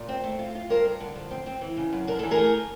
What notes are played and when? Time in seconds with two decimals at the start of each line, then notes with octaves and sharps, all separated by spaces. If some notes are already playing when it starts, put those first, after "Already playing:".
Already playing: A#2
0.09 C4
0.24 A3
0.39 F4
0.55 F4
0.69 G2 A#4 C5
0.85 G2
1.00 D3
1.16 F3
1.31 C4
1.46 C4
1.61 E3
1.77 C#3
1.93 F#2
2.07 D4 A#4
2.19 E3 A4
2.31 G#4 A#4
2.37 A3